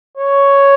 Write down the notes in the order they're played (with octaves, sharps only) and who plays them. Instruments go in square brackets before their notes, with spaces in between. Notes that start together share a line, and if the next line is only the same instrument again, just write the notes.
[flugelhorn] C#5